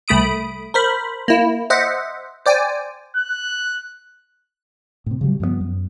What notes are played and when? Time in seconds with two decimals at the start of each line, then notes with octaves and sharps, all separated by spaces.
0.08 C2 A3 B5 D#6 D7
0.74 A#4 C5 B5
1.28 A#3 E4
1.70 C5 D#5 E5 F#5
2.46 C5 D5 G5 G#5
3.17 F#6
5.06 A2 C3
5.21 C#3 F#3 G3
5.40 G2 F3 G#3 B3
5.61 F#2